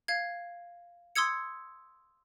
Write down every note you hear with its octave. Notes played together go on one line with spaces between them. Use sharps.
F5 G#6
C6 D#6 E6 G#6 C#7